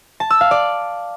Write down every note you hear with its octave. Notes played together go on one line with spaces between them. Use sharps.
A5
E6
F5
D5